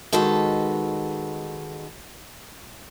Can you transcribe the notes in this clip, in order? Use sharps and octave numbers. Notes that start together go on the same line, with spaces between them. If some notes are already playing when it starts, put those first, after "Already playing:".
D#3 G#3 F#4 A4 B4